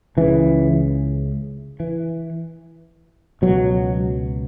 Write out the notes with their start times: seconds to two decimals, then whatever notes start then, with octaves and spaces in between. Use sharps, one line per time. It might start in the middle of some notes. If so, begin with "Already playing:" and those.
0.17 C#2 C#3 E3
1.80 E3
3.42 C#2 B2 F#3